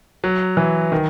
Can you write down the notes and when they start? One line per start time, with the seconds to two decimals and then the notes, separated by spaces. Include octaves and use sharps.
0.24 F#3
0.57 E3
0.92 D#3